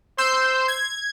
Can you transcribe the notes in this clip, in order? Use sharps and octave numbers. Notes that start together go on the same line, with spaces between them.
C5 C6 E6 G6
G#6